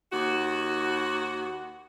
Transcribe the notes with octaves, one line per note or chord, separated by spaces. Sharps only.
D#2 F#4